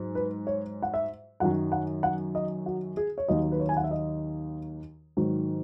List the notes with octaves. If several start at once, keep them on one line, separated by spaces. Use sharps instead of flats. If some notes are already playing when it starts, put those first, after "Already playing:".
Already playing: G#2 F#3
B4
C#5
F#5
E5
F#2 D#3 F#3 F#5
F#5
F#5
D#5
F#4
G#4
C#5
D#2 D#3 F#3 D#5
B4
C#5
G#5
F#5
E5
D#5
G#2 D#3 F#3